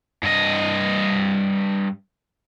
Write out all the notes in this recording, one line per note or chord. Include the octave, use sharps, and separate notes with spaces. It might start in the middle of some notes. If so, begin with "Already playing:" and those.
G2 D#5